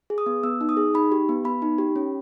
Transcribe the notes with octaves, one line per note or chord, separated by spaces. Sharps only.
G#4
D#6
B3
B3 E6
D#4
D#6
G#4
D#4 B5
G4
B3
B3 B5
D#4
G4
C#4